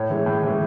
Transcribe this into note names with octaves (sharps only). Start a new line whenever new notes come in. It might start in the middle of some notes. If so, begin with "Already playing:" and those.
Already playing: A2 C#5
E3 G#3
A2
E3 G#3